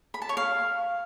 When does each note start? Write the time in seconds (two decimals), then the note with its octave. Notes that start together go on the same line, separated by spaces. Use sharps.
0.14 B5
0.22 A5
0.29 C#5
0.37 F5